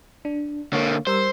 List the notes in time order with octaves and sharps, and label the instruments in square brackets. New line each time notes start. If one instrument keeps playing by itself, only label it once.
[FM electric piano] D4
[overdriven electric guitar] D3 A#3 [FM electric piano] C#5
[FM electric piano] G3 A#4 E6 [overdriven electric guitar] C5